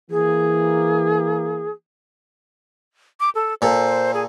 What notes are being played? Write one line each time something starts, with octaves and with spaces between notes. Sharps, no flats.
E3 A#3 G#4
D6
A4
A#2 A4 C5
G#4